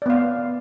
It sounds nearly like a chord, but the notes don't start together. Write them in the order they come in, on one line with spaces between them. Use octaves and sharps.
D5 B3 F5